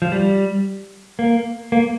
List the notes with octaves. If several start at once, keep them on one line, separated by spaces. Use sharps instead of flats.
F3
G3
A#3
A#3